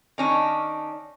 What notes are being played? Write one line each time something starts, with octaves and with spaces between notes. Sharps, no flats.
D#3 C#4 D4